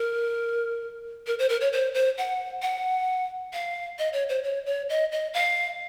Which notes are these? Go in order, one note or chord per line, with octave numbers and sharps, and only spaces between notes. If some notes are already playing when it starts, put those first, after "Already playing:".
Already playing: A#4
A#4
C5
A#4
C#5
C5
C5
F#5
F#5
F5
D#5
C#5
C5
C#5
C#5
D#5
D#5
F5